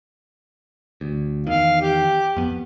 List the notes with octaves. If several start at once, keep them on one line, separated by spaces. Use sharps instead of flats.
D2
E2 D#3 F5
G4
F2 B3